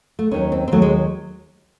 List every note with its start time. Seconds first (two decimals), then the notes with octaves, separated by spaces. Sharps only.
0.19 A3
0.31 D#2 D#3 F#3 C#4
0.52 C4
0.68 C4
0.72 D#2 D#3 F#3 A3
0.82 G#3